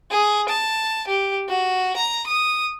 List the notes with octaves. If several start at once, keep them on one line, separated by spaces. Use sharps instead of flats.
G#4
A5
G4
F#4
A#5
D#6